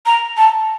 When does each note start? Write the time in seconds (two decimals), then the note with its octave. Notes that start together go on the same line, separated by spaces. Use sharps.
0.06 A#5
0.37 A5